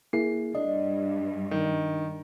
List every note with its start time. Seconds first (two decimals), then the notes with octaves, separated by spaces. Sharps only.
0.13 A#3 E4 G#4 C7
0.55 G2 D4 D#5
1.51 D#3